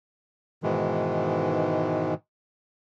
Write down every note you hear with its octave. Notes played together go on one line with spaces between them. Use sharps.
G#2 B2 D#3 E3 G#3